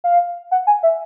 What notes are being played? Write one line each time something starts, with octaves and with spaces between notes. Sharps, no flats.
F5
F#5
G#5
E5